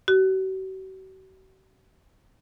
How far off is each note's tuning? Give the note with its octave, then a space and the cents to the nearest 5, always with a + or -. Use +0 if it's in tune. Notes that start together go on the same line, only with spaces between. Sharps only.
F#4 +45